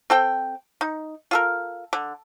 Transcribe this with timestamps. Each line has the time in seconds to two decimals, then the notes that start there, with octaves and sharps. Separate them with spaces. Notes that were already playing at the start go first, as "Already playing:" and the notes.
0.10 C4 A4 G5
0.81 D#4
1.31 F4 A4 A#4
1.93 D3